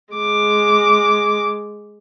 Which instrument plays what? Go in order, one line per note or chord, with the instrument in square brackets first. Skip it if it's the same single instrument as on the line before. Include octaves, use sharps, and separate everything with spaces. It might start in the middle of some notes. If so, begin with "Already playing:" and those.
[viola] G#3 D6